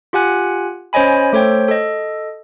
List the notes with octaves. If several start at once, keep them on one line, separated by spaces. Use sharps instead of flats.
F4 G4 F#5 G#5 F#6
C#4 C5 C#5 D#5 G#5 B5
A3 A4 C5 C#5 G5
A4 D#5